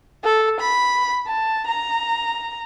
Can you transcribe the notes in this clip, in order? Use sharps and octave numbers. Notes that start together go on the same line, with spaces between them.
A4
B5
A5
A#5